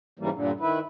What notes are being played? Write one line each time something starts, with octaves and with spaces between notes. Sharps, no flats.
G#2 C#3 E3 G3 A#3
G2 A#2 D3
D#3 E4 B4